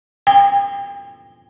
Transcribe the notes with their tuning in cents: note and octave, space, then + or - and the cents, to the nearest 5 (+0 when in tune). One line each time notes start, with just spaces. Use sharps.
G5 +40